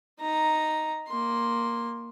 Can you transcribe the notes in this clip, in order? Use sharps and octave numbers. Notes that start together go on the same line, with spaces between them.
D#4 A#5
A#3 C6